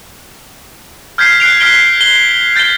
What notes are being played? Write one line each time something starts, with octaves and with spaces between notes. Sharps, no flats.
F6 G6 G#6 B6 C7
F#6 C7 D7 F7
F6 B6 D7 G7
G7
G7
G6 A6 B6 D7 G7